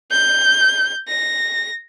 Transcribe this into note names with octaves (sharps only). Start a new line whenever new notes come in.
G6
A#6